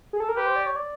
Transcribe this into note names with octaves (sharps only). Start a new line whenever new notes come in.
G#4
A4
A#4
G4 B4
C5
D5
C#5
D5